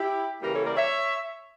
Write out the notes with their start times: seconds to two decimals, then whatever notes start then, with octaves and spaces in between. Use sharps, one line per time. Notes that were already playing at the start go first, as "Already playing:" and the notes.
Already playing: E4 G4
0.41 C#3 E3 G3 A#3 G4 A#4
0.53 A4 C#5
0.64 A#4 D5
0.77 C#5 E5